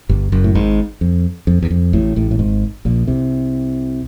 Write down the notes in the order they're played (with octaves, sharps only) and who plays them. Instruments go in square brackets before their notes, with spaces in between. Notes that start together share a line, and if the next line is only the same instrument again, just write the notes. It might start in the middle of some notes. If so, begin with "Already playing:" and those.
[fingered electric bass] G1 G2
F#1 F#2
A2
G#1 G#2
F2
F2
E2
F2
A1 A2
A1 A2
A2
G#1 G#2
A#1 A#2
C2 C3